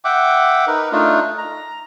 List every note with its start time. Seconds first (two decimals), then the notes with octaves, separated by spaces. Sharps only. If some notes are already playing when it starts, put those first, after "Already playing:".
0.05 E5 F#5 G5 D6
0.67 D#4 A#4 B4
0.92 A3 D4 D#4 F4
1.38 A#5